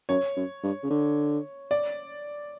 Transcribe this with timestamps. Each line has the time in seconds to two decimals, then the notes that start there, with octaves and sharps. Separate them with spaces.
0.09 F#2 C#5
0.36 F#2
0.63 G2
0.83 C#3
0.90 D3
1.71 D5